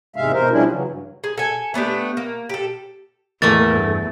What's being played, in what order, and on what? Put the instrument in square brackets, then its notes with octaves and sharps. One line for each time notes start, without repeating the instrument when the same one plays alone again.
[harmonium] E2 G#2 C3 G#3 E5 F5
B2 A#4 C5
F3 G3 G#3 C#4 D4 E4
C#3 E3 F#3
G2
[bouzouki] G#4
A4 G#5
A3 B3 D4 G4
A#3
G4 A4
[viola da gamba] E2 [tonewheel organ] A2 A#3 A#4 [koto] E3 A3 [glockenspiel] A6
[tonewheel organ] G2 A4